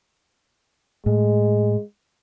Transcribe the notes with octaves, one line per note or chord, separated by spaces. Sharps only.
A2 G#3